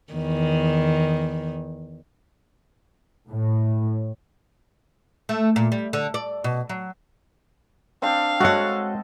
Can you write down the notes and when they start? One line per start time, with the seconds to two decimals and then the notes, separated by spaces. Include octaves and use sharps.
0.13 E2 D#3
3.29 A2
5.29 A3
5.56 A#2
5.72 G3
5.93 D3
6.14 D5
6.44 B2
6.69 F#3
8.02 C4 D4 F5 G5
8.40 G#3 F#4 A4 C#5 D#5 F#5